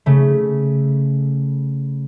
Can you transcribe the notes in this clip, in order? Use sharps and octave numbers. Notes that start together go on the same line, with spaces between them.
C#3 A3